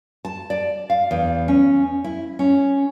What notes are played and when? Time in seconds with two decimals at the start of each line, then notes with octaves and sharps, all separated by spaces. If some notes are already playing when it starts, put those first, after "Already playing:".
0.25 A5
0.50 D5
0.90 F5
1.11 E2
1.48 C#4
2.04 E4
2.39 C#4